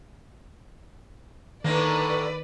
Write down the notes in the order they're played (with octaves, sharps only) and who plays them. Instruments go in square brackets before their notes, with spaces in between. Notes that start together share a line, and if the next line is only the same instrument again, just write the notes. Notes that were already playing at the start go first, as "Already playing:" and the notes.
[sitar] A2 D3 A#3 [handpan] D#3 [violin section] B4 D5